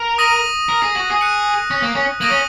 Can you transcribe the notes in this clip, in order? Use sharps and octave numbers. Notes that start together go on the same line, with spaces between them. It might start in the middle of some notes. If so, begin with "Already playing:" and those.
Already playing: A#4
D#6 A#6 D#7 F#7
A#4
G#4
F#4
G#4
F#6 C#7 F#7
C#4
A#3
C#4
A#3 D#6 A#6 D#7 F#7
C#4